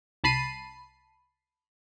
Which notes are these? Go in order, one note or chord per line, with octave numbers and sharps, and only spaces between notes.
C2 A5 B5 C7 D#7